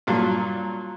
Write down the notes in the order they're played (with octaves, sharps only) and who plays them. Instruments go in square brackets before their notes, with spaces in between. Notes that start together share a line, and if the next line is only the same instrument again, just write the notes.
[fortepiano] G2 A#2 F#3